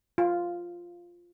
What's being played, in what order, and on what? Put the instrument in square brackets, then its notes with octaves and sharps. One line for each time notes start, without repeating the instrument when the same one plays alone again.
[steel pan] F4